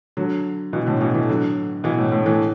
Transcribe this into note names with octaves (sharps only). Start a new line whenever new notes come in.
D3 F#3
B2 E3
A2 D3
B2 E3
E3 A3
D3 F#3
B2 E3
A2
A2
E3 A3